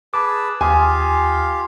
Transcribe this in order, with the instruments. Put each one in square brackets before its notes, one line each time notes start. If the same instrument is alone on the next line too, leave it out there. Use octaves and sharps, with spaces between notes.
[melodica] G#4 B4 A5 [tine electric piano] D6
[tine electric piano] D#2 D#6 [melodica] F4 G4 F5 [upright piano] G#5